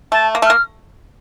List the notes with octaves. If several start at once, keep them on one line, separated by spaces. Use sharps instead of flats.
A3 A5
A#3
A3
A#3 F6